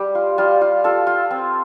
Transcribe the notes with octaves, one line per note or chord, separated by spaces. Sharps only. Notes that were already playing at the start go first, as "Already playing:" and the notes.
Already playing: G3 G4
F4
G3 F4
F4
F4 A4
F4
C4